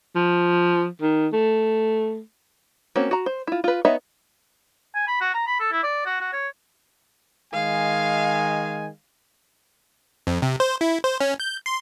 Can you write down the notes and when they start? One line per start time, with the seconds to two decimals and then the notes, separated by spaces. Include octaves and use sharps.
0.16 F3
1.01 D#3
1.33 A3
2.96 A#3 C4 C#4 F#4
3.11 F#4 A#5
3.26 C5
3.47 E4 F4
3.64 F4 B4
3.85 B3 D#4 C#5 D#5 E5
4.95 G#5
5.07 B5
5.21 F#4
5.34 A#5
5.47 B5
5.60 A4
5.72 E4
5.83 D5
6.06 F#4
6.21 F#4
6.33 C#5
7.53 D#3 G#3 F5 G#5
10.27 F2
10.42 C3
10.60 C5
10.81 E4
11.04 C5
11.20 C#4
11.40 G6
11.66 C6